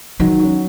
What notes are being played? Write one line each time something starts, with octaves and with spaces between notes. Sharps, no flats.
D#3 F#3
C#4 F#4